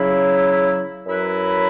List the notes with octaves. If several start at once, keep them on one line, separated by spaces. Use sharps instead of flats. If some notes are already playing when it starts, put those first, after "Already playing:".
Already playing: C#3 F#3 E4
F#2 F#3 E4 B4